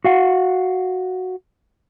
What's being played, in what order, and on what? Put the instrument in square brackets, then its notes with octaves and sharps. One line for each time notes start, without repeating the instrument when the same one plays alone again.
[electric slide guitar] F#4 F5 F#5